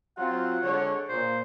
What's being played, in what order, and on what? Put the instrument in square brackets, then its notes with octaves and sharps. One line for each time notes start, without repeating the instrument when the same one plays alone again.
[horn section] F#3 C4 F4 [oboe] F#5
[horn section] D3 G#3 C#5
[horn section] A#2 [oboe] C5